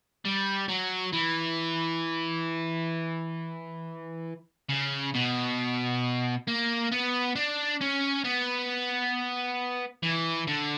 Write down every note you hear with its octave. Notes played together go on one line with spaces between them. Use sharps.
G3
F#3
E3
C#3
B2
A#3
B3
D4
C#4
B3
E3
D3